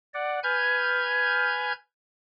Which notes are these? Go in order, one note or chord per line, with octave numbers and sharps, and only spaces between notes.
D5 F#5
B4 G#5 F6 G6 G#6